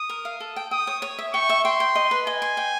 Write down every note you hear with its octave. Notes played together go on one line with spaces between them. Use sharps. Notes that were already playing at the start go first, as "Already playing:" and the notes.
Already playing: D#6
A#4
F5
A4
G5
G5 D#6
C#5
C#5
E5
G5 C#6
E5
G5 C6
G5
D#5
B4
D#5 G#5
C6
G5